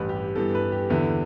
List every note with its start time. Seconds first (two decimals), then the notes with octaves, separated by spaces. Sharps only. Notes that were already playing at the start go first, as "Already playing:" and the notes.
Already playing: A1 G2 G3 B4
0.09 G4
0.36 G2 E3 B3 A4
0.55 B4
0.72 G4
0.90 E2 D3 B3 E4